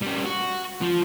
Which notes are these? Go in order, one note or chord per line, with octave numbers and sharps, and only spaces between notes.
G3 C#4
F#4
F3